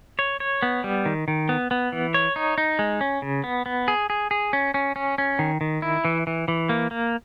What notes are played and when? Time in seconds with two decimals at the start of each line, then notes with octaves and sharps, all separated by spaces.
0.19 C#5
0.40 C#5
0.62 B3
0.84 G3
1.06 D#3
1.28 D#3
1.49 B3
1.71 B3
1.92 E3
2.14 C#5
2.36 D#4
2.58 D#4
2.79 G#3
3.01 C#4
3.22 C#3
3.44 B3
3.66 B3
3.88 G#4
4.10 G#4
4.31 G#4
4.53 C#4
4.74 C#4
4.96 C#4
5.18 C#4
5.39 D#3
5.61 D#3
5.82 E4
6.05 E3
6.27 E3
6.48 E3
6.69 A#3
6.91 A#3